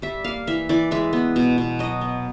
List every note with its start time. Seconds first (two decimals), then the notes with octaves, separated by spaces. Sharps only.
0.02 G3 E5
0.24 A#3 F5
0.47 E3 E5
0.69 E3 D5
0.91 G#3 E5
1.13 B3
1.36 B2
1.58 B2
1.79 F#3 D#5
2.01 B3